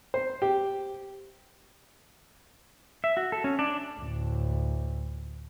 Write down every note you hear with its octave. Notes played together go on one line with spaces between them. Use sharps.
C5
G4
E5
F#4
A4
C#4
D4
D2 A2